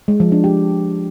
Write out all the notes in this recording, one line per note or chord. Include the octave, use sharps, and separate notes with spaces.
G#3
F3
D4
G4